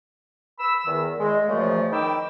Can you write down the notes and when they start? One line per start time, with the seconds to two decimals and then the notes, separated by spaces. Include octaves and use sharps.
0.59 B5 E6
0.86 E2 D#3
1.19 G#3
1.48 F#2 A#2 C#3 E3 F3 A3
1.91 D#3 D#4 B4 G5 D6 E6